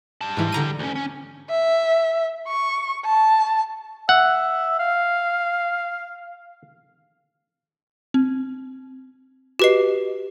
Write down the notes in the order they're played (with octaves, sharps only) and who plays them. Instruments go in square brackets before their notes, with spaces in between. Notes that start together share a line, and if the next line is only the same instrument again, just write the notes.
[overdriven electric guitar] G3 A5
[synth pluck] G#2 E3
D3 A#5 D#7
[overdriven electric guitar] D2 C#4
C#4
[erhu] E5
C#6
A5
[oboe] E5 [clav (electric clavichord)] F#5
[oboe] F5
[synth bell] C4
[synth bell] F#4 D#5 [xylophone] G4 B4 C7